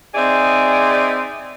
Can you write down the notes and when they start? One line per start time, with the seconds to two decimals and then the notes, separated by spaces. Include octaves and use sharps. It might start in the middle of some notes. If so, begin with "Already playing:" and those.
0.15 C4 D#4 G#4 D5 E5